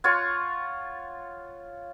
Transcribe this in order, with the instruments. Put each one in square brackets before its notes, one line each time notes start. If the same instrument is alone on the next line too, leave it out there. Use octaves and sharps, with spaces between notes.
[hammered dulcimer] F4 C#5 F#5